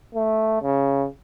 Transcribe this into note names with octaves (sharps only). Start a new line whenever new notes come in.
A3
C#3